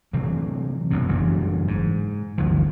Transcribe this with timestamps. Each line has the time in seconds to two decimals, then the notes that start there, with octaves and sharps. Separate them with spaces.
0.13 C3 E3 F#3
0.91 B1 F#2 C3
1.08 F#1 G2 E3
1.68 G#2
2.38 G1 D2 E3 F3